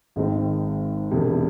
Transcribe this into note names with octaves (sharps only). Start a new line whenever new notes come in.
G#1 G#2 D#3 G#3 C4
E1 E2 C3